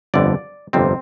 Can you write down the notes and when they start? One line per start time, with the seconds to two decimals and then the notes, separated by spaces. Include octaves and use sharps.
0.14 G1 F2 D3 D5
0.73 G1 F2 C3 G3 C4